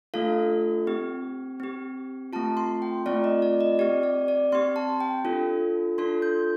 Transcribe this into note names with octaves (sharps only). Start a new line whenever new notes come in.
A3 D4 F4 A4 F5
C4 G4
C4 G4
A3 C4 F4 A5
C6
G5
A3 C4 F4 D5
D#5
D5
D#5
C4 G4 D5
D5
D5
C4 G4 C6
A5
G5
D4 F4 A4
D4 F4 A4 C6
G6